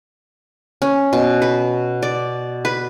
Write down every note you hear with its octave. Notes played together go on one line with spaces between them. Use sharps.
C#4
B2
B4
D5
B4